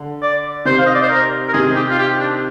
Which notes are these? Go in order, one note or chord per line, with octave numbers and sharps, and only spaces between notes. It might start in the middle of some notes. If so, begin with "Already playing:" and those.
Already playing: D3
D5
C3 D#3 C5
F5
D#5
D5
C5
A#4
A#4
C3 D#3 G#4
G4
F4
G4
D4